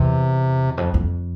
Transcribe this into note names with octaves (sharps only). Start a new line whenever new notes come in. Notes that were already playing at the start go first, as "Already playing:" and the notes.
Already playing: E2 C3
F2
F2